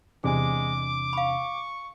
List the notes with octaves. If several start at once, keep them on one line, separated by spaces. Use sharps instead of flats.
E2 C3 G#3 D4 G#4 G#5 D6
F5 B5 C#6